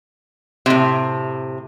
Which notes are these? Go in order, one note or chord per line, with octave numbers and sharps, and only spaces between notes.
A2 C3